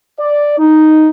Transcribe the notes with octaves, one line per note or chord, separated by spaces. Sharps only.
D5
D#4